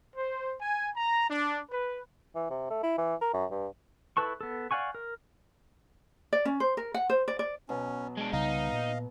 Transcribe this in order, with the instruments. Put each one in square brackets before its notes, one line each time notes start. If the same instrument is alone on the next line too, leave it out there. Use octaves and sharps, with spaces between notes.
[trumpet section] C5
G#5
A#5
D4
B4
[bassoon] E3
C3
A3
E4
E3
A#4
F#2
G2
[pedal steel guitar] E4 A4 B4 A5 C#6
B3 A4
D5 F5 F#5 G#5 C#6
A#4
[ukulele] D5
C#4
C5
A#4
F#5
C5
D5
D5
[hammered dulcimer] B2 F#3 B3 [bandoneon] C#4
[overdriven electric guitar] G#3 D4
[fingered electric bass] C2 C#3 G3 [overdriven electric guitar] D#4 [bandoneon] D#5 F5
[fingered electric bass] A#2